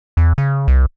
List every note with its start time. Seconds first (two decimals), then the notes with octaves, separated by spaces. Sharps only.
0.17 E2
0.38 C#3
0.68 C2